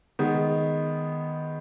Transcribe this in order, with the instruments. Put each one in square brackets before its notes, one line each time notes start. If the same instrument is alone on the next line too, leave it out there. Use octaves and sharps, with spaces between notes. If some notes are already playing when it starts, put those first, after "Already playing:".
[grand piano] D#3 G#3 B3